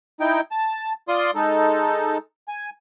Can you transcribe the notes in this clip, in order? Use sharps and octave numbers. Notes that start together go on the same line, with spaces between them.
D#4 E4 G5
A5
F4 D5 C6 D#6
G#3 D#4 A4
G#5